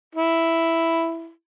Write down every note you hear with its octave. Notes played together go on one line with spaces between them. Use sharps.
E4